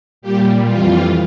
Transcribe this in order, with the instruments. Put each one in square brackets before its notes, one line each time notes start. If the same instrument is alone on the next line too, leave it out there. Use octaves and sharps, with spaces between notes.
[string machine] A#2 G3 G4
F2 E3 G3 F4